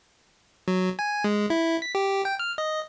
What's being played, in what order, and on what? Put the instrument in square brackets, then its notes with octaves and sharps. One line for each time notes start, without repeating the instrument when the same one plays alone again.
[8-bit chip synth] F#3
G#5
G#3
E4
B6
G4
G5
F6
D#5